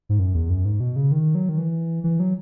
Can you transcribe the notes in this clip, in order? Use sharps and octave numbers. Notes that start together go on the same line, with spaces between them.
G#2
F#2
E2
F#2
G#2
B2
C#3
D#3
F#3
D#3
E3
E3
F#3